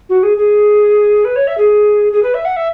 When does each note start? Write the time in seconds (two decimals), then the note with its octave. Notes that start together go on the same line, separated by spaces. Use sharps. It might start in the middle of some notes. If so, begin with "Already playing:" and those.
0.09 F#4
0.23 G#4
0.37 G#4
1.25 B4
1.36 C#5
1.47 E5
1.58 G#4
2.13 G#4
2.23 B4
2.34 E5
2.45 F#5
2.56 E5